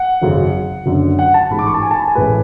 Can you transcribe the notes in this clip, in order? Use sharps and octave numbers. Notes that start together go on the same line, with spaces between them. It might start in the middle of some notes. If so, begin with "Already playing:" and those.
Already playing: F#5
G#1 F#2 C#3
F#1 F#2 D3
F#5
A5
A1 G#2 G#3 B5
D6
C#6
A5
G#5
A5
B5
G#5
A1 A2 G#3 B4